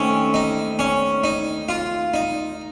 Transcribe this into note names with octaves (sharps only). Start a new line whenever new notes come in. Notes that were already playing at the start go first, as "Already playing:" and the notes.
Already playing: D#2 D#3 A3 C4 C#4
D#4
C#4
D#4
F4
D#4